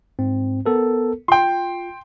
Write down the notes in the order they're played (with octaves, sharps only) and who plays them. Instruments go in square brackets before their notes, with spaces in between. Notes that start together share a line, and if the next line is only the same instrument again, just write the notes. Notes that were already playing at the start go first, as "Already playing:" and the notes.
[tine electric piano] G#2 C4
B3 A4 A#4
[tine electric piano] F4 [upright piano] G5 C6